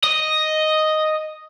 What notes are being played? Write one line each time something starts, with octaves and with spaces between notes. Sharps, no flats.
D#5